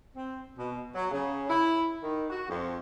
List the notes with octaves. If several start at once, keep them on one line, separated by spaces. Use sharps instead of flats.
C4
B2
F#3
C#3
E4
D#3
F#4
F2